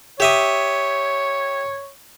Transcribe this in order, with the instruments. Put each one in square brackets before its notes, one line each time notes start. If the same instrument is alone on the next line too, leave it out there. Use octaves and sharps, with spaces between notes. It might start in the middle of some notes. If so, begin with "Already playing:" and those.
[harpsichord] G4 E5 D#6 [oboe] C#5